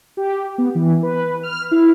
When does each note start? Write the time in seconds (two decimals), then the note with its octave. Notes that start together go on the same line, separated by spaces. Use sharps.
0.17 G4
0.58 B3
0.75 E3
1.03 B4
1.43 F6
1.71 E4